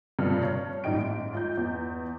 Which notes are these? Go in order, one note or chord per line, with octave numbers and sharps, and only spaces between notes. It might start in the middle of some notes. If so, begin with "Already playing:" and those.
F1 G2 B2 C4 F4 F6
C#5
A1 G3 D#4 D#5 G5 D7
G#2
F4 D#5 G6
E2